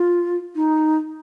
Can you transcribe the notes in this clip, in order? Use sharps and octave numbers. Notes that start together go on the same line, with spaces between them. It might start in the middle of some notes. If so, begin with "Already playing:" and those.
Already playing: F4
D#4